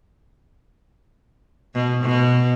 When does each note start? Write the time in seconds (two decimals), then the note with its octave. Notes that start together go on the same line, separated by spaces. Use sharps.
1.75 B2
2.03 B2